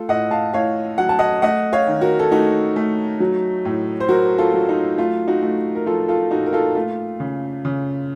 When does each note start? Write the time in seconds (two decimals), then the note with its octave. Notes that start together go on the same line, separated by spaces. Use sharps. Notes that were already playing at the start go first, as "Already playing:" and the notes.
Already playing: A3 F4 A4
0.09 A2 D#5 F#5
0.31 F5 A5
0.54 A2 C#5 F5
0.98 F#3 F#5
1.09 A5
1.19 D#5 F#5
1.42 A3 D#5 F#5
1.73 C#5 F5
1.87 D#3
2.01 F#4 A#4
2.19 A4
2.31 A3 D#4 F#4
2.76 A3
3.20 F#3
3.65 A2
4.00 C5
4.09 F#3 F#4 A#4
4.38 F4 A4
4.54 F#3
4.69 D#4
4.98 A3 F4
5.27 D#4 F#4
5.42 A3
5.75 A#4
5.86 F3 F4 A4
6.08 F4 A4
6.31 A#2 D#4 F#4
6.46 A#4
6.53 F4 A4
6.75 A3 F4
7.20 C#3
7.65 C#3